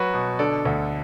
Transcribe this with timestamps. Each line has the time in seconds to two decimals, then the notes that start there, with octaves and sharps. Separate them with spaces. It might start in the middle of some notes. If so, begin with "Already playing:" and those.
Already playing: F#3 F#4 B4
0.14 B2
0.39 D3 A4 D5
0.65 D2